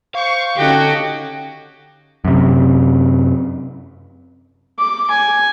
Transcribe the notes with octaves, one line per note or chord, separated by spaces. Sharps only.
C5 F5 C#6
D3 C#4 D#4 F#4 G4
F#2 C3
D6
G#5